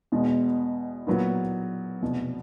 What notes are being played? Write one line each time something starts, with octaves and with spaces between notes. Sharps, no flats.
E2 B2 G#3
A#2 F#3 B3 E4
F1 E2 B2